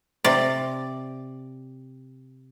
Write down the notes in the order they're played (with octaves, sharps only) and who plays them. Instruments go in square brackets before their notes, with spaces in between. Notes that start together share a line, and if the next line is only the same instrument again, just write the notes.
[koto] C3 D5